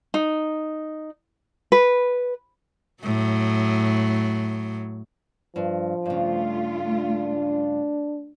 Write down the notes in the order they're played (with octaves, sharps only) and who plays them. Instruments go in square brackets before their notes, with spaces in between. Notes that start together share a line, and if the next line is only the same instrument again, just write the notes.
[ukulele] D#4
B4
[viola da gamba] A2 F#3
[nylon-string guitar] G2 [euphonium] F3
[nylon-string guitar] G2 C#3 [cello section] A3 F4
[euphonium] D4